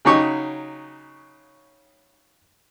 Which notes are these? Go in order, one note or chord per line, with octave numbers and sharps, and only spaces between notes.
C#3 F#3 D#4 G4 C#6 D#6